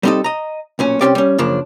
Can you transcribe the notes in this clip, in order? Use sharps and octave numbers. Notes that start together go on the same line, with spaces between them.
G3 B3 C4 D#4 A4 D#5
D#5 A#5
B1 A#2 C#4
C2 C#3 C4 C#4 G4 D5
G3 C#4
F#2 C#3 F3 A#3 D4